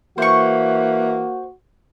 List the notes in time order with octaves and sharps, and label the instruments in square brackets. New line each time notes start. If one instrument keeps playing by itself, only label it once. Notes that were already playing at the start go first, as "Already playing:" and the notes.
[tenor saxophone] E3 [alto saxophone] A#3 [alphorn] F#4 [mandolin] C5 C#6